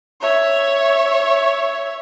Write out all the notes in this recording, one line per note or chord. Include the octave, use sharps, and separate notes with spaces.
C#5 E5